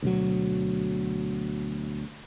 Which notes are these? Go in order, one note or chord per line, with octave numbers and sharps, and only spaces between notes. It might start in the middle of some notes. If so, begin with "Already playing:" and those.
D2 B2 F#3